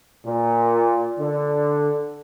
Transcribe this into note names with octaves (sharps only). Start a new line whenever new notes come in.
A#2
D3